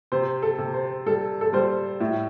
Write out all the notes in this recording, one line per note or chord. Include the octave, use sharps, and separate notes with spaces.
C3 C5
A4
C3
C5
G3 A4
A4
G3 C5
A2 E5